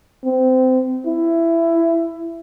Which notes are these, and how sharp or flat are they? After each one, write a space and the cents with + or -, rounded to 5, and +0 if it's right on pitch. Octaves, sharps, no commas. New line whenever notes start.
C4 -25
E4 +15